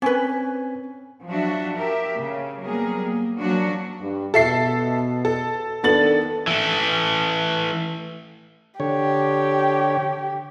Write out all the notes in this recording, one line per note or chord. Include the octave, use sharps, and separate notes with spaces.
C4 C#4 B4 G#5
F3 F#3 D4 F#4 E5
G4 A#4 E5
C#3
F#3 G3 A#3 B3 G#4 A#4
A#3
F3 F#3 A#3 C#4 D4 F#4
G2
B2 A4 E5 C7
A4
D#3 B3 D4 A4 A6 F#7
E3 A3
D3 G4 C#5